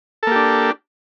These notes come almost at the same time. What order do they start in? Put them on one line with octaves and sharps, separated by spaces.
A4 A#3 G4 D4